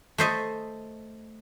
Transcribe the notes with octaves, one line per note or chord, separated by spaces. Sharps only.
A3 C5 D#5